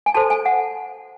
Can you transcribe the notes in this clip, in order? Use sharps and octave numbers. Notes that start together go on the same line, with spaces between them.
G#5
F#4 A4 C5 A5
G#5
F#5